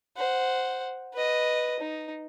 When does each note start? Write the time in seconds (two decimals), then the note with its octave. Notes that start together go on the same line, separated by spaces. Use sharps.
0.16 C5 F#5
1.13 B4 D#5
1.80 D#4